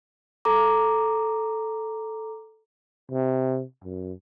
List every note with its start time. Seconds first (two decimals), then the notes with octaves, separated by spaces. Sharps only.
0.45 A4 A#5 D6
3.12 C3
3.84 F#2